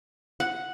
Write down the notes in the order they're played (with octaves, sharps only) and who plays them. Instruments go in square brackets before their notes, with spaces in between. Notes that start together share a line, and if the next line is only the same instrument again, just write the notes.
[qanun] F#5